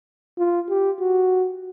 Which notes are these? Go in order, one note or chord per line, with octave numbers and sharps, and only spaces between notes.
F4
G4
F#4